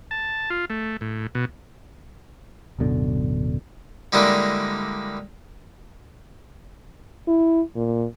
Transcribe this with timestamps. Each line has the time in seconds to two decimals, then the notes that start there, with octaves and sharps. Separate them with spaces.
0.11 A5
0.50 F4
0.70 A3
1.01 A2
1.35 B2
2.79 D1 F#2 B2 D3
4.12 D3 G3 G#3 A#3 D4 E4
7.27 E4
7.76 A#2